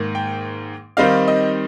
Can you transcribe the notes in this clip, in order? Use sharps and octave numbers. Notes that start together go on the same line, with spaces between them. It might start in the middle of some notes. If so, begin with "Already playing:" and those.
Already playing: G#2 D#3 A#3
G5
D#3 G3 C4 D#4 F5
D#5